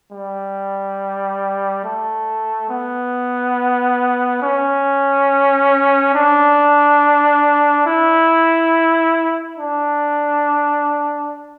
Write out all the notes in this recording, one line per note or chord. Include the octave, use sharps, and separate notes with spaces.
G3
A3
B3
C#4
D4
E4
D4